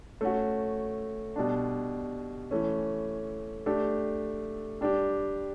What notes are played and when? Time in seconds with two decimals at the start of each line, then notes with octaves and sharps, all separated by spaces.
0.21 A3 C#4 F#4
1.36 B2 G3 D4
2.51 E3 A3 C#4
3.66 A3 D4 G4
4.81 G3 D4 G4